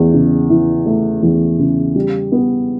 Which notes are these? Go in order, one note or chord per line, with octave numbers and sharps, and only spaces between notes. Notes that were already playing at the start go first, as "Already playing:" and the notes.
Already playing: E2 A3
C#3
E3
A3
E2
C#3
G3
B3